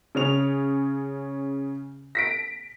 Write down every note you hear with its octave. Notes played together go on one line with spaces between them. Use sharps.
C#3 C#4 F7
A#6 B6 D7